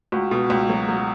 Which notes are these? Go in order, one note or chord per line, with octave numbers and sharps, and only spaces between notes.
C#2 F#4
B2
C#2
F#3
F#3